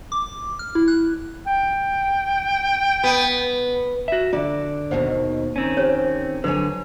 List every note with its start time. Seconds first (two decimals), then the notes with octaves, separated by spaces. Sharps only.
0.12 D6
0.59 F6
0.75 E4
0.88 F#6
1.47 G5
3.04 B3
4.08 F#4 E5
4.33 D3 F4 D5
4.91 D#2 B2 D#3 C5 F#5
5.56 D#3 C4 C#4
5.77 G4 C5 C#5
6.44 D3 F#3 B4 C#5 G#5